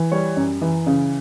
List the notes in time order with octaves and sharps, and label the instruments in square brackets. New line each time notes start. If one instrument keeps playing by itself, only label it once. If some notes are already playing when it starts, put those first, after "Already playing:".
Already playing: [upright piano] E3
G3 C#5
F#2
E3
C#3